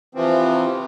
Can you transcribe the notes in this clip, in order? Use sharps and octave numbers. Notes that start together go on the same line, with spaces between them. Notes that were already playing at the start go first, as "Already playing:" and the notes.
C3 E3 F3 C4